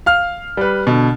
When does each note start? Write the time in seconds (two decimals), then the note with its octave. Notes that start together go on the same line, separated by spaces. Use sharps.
0.06 F5 F6
0.57 G3 B4
0.87 B2 D3